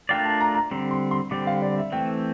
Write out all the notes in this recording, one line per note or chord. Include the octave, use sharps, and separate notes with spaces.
A3 D4 F4 A#4 D5 G5
A5
A#5
A#5
D3 G3 C4
C6
C6
D3 G3 C4 D6
F5
D5
E5
E3 A3 C4 G5